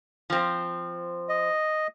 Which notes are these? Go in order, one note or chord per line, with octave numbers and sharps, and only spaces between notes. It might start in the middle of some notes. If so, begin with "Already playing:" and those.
F3 C4
D#5